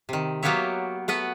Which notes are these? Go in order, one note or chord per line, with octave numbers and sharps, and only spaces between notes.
C3 D#3
F#3 A#3 B3 G4 C#5 E5
A3 B3 B4 F#5